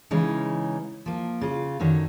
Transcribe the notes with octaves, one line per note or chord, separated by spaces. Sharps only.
C#3 E3 G#3 C#4 D#4
F3 A#3
C#3 F4
F#2 D3 D#3 C#5